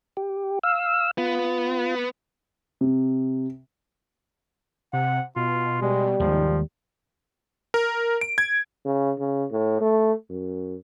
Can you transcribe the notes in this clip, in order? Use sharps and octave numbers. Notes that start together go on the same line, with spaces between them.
G4
F5 E6
B3 F4
C3
C3 F#5
B2 F4
B2 G3 G#3
D#2 G#2 D#3 F3 G#3
A#4
D7
G#6
C#3
C#3
A2
A3
F#2